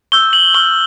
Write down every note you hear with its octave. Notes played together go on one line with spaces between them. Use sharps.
C#6 E6 G6 G7
F#7
C#6 F6 G7